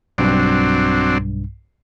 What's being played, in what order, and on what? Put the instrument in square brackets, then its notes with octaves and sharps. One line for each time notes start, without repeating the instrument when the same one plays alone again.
[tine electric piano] B1 G2 [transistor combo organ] F#3 C4 D4